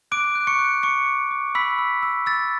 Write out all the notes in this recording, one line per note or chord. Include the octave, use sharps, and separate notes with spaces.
D6 F#6 D7
F#6
C#6 C#7
F#6
C#6 D6 C#7
D6
D6
B5 E6 B6
E6
E6
E6 A6